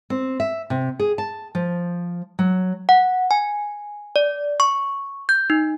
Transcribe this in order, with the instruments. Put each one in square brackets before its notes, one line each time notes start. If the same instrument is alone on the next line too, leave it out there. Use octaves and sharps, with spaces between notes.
[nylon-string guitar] C4
E5
C3
G#4
A5
F3
F#3
[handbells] F#5
G#5
D5
C#6
G6
D#4